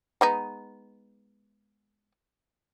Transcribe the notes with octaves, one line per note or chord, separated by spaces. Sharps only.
G#3 B3 D#4